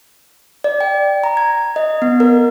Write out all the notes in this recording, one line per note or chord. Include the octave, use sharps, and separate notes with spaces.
D5
G5
A#5
G#6
D#5
B3
A#4